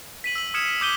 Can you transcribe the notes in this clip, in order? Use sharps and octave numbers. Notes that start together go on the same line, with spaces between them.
B6 D#7 F#7
E6 F#7
D#6 F6 G#6 C#7 E7
D6 D#6 G6 B6 D#7 G7